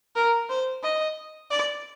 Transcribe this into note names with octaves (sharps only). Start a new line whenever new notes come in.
A#4
C5
D#5
D5